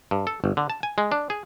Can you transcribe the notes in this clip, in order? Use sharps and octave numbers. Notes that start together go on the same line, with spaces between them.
G2
A4
G1
D3
A5
G#5
G#3
D4
G#4